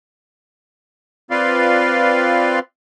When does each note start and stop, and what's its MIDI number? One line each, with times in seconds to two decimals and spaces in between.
1.31 2.59 60
1.31 2.59 65
1.31 2.59 71
1.31 2.59 74
1.31 2.59 77
1.31 2.59 84